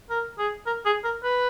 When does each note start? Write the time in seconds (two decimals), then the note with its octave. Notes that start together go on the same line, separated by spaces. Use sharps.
0.10 A#4
0.39 G#4
0.67 A#4
0.86 G#4
1.04 A#4
1.24 B4